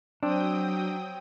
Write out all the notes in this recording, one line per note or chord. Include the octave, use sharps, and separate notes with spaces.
F#3 C4 D4 G5 D#6